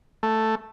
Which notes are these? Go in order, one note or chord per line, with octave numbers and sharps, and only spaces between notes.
A3